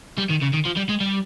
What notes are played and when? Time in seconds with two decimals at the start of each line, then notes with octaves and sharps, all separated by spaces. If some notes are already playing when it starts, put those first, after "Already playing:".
0.18 G3
0.30 D#3
0.42 C#3
0.53 D#3
0.65 F3
0.77 G3
0.89 G#3
1.00 G3